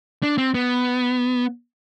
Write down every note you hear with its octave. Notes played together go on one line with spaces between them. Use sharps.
D4
C4
B3